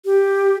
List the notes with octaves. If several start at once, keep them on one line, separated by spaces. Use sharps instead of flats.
G4